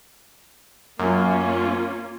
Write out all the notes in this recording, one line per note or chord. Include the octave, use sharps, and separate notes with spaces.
F#2 A#3 C#4 F4